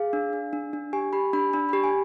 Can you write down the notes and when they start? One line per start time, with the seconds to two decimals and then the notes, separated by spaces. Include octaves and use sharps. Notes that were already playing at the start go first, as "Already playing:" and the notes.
Already playing: G#4 F5
0.13 D4
0.33 D4
0.53 D4
0.73 D4
0.93 G4 G#5
1.13 G4 B5
1.33 D4 B5
1.53 D4 B5
1.69 G4 B5
1.83 G#5